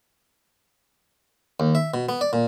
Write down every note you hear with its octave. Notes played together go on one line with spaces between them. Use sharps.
D#2
E5
B2
B3
D5
A#2